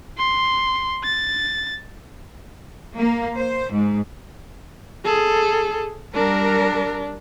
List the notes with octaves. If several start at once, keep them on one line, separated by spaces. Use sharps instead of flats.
C6
A6
A#3
C5
G#2
G#4 A4
G3 D4 A#4